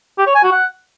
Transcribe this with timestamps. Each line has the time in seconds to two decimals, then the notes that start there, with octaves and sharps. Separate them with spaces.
0.18 G4
0.27 C#5
0.35 G#5
0.43 F#4
0.52 F#5